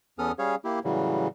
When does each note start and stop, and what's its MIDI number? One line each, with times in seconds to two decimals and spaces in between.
0.19 0.32 40
0.19 0.32 59
0.19 0.32 61
0.19 0.32 69
0.19 0.32 87
0.19 0.32 89
0.39 0.55 55
0.39 0.55 61
0.39 0.55 68
0.39 0.55 73
0.39 0.55 77
0.65 0.79 58
0.65 0.79 64
0.65 0.79 67
0.84 1.28 45
0.84 1.28 49
0.84 1.28 52
0.84 1.28 54
0.84 1.28 55